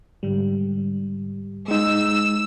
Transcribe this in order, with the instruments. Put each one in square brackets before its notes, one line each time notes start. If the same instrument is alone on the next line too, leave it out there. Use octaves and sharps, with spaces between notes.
[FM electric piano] G#2 D3 G3
[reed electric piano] G#3 D#4 [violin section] E6